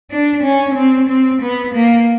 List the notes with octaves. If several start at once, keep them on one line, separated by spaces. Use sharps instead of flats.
D4
C#4
C4
C4
B3
A#3